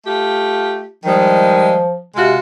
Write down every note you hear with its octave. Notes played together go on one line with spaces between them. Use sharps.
A3 F4 G4
D#3 F3 G3 G#3
C3 G#3 F4 F#4